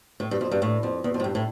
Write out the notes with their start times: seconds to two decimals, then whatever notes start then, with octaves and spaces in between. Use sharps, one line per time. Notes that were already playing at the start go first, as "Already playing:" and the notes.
0.20 A2
0.31 G2
0.41 F2
0.51 G2
0.62 A2
0.83 F2
1.04 E2
1.14 F2
1.20 A2
1.24 G2
1.35 A2